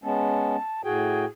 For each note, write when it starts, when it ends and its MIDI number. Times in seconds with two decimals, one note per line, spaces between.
0.04 0.56 56
0.04 0.56 59
0.04 0.56 61
0.04 0.82 81
0.84 1.25 45
0.84 1.25 66
0.84 1.25 68
0.84 1.25 79